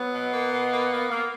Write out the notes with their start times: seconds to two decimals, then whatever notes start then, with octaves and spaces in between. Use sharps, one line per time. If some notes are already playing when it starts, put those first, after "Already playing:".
Already playing: F#3 B3
0.13 B2
0.32 A#3
0.52 B2
0.72 A#3
0.91 A#3
1.10 A#3